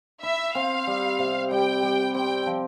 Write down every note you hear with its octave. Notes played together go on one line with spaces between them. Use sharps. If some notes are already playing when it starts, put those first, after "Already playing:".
E4 E5
C4 F5
G3
C3
G3 G5
G3
C4 G5
F3